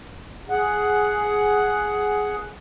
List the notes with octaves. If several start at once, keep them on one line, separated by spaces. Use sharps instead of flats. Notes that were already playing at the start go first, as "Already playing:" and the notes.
G#4 F#5